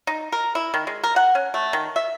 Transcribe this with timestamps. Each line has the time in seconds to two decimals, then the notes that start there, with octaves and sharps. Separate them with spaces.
0.07 D#4
0.32 A#4
0.55 E4
0.74 D#3
0.87 G#3
1.04 A#4
1.16 F#5
1.35 C#4
1.54 A3
1.73 D#3
1.96 E5